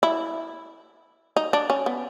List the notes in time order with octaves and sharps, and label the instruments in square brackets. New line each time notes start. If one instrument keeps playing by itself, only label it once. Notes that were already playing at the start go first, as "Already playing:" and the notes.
[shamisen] E4
D#4
D4
C#4
B3